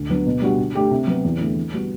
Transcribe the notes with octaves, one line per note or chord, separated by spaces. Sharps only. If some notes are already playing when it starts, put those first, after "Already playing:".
Already playing: D2
D3 F#3 B3 D4
B2
G3 D4 F#4
D3
A3 D4 G4
C3
F#3 B3
E2
D3 A3 E4
E3
G3 B3 F#4